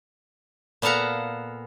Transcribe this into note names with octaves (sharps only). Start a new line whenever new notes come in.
A#2 B3 A4 F5 F#5 A#5